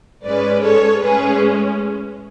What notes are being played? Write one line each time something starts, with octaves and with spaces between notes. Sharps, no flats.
G#2 G#3 C#4 B4 D5
A4 C#5
A2 G#3 C#4 G#4 B4